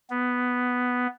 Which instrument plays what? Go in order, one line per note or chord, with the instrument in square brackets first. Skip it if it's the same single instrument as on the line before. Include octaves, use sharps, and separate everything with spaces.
[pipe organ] B3